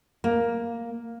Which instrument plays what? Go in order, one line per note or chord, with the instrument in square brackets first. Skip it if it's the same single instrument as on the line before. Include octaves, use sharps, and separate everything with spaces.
[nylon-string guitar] A#3